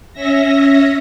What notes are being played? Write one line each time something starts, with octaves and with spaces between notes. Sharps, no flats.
C#4 E5 A#6